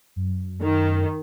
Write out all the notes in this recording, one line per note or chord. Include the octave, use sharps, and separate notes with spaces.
F#2
D#3